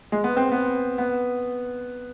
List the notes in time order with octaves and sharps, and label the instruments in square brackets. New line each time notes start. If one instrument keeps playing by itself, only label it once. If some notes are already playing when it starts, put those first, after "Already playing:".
[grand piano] G#3
B3
C4
B3
B3